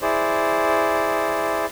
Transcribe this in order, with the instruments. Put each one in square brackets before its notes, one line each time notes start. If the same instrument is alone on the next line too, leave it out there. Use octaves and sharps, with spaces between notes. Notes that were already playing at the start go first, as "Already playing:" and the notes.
[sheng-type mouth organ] E4 G#4 C5 D5